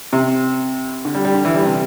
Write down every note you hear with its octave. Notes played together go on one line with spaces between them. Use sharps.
C3
D3
G3
G3
D3
E3
G3
C3